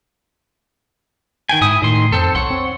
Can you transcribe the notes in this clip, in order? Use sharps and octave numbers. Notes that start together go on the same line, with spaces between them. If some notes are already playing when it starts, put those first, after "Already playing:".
D#3 G5 G#5
G#2 E4 G#5 D#6
A2 D#3 C6
F2 C4 A4
B1 C#5 F#5 C6
C4